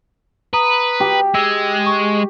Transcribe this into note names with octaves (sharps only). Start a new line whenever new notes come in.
B4 A#5 D#6
G4
G#3 E6
C#6